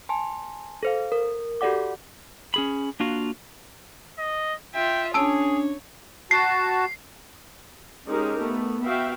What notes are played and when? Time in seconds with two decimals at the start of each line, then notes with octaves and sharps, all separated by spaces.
0.09 G#5 A5 C6
0.83 A4 C5 F5
1.12 A#4
1.61 F#4 G4 A4 D5 F#5 D6
2.54 C#4 G#4 B5
3.00 A#3 D4 F4 F#4
4.18 D#5
4.75 F4 E5 G5
5.14 C#4 D4 G#4 C#5 A5 E6 D7
6.31 F#4 A5 C7
8.07 G#3 C#4 D#4 G4 A#4
8.39 A3 B3
8.83 B3 F#4 E5 F5 G5